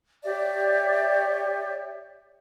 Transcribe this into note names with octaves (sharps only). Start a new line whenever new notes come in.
G4 C#5 D5 E5